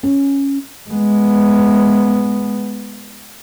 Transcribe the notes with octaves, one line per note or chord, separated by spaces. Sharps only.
C#4
G#3 B3